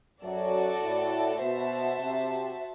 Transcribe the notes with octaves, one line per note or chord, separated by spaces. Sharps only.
F#2 F#3 F#4 A4 D5
A2
B2 F#4 C5 E5 A5
C3